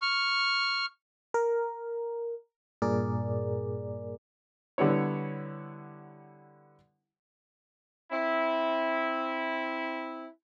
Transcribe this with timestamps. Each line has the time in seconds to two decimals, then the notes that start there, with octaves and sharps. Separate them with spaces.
0.02 C#6 F6
1.34 A#4
2.82 G2 A#2 G#4 A#4 D5
4.78 D3 G3 B3 E4 C#5
8.11 C4 E4